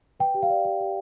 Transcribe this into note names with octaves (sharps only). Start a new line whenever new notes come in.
B4 G5
G4
F5
D5
G4 F5
G4